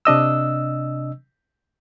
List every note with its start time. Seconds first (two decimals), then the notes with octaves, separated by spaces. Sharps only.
0.05 C3 D4 D#5 E6